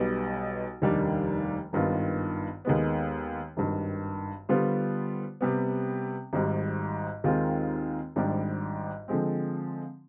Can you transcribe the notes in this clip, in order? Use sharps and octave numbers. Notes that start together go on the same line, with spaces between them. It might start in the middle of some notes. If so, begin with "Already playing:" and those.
Already playing: B1 B2 G3 B3
F1 D#2 D#3 G3 D4
G#1 G2 D#3 B3 F4
D#2 D#3 G#3 B3
G#1 G2 D#3
D3 G3 B3 F4 C5
C3 G3 B3
G#1 G#2 G3
D#2 D#3 G#3 C4 F4
G#1 G#2 G3 D4 G4
D3 F3 G#3 C4